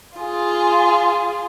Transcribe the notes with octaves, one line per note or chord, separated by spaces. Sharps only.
F4 G#4